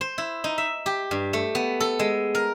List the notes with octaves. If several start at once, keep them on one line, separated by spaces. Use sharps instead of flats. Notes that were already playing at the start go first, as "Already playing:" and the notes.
C5
E4
D#4
E5
G4
G2
A3
B3
A4
G#3
A#4